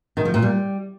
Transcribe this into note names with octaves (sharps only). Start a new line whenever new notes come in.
D#3
F3
A#2
G3